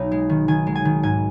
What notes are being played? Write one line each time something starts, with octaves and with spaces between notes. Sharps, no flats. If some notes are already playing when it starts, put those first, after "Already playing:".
Already playing: B1 D#4
G#3
D#3
D#3 G#5
G#3
G#5
D#3
G#2 G#5